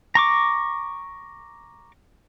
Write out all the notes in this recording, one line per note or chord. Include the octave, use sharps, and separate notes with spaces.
A#5 C#6 D6